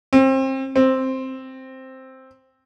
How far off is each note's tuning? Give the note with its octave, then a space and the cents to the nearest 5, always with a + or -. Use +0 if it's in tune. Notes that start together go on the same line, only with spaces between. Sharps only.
C4 +30
C4 +5